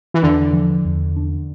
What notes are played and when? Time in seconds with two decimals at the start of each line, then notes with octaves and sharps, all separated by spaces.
0.14 E3
0.23 E2 D3
0.53 F3
0.85 E2
1.16 D4